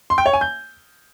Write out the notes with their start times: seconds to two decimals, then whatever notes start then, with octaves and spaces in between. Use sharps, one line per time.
0.10 C6
0.18 G5
0.26 C#5
0.33 G#5
0.41 G6